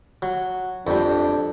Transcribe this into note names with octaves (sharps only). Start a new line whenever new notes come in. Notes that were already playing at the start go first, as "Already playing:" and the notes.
F#3
F2 G3 D4